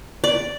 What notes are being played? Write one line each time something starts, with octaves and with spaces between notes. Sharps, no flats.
D5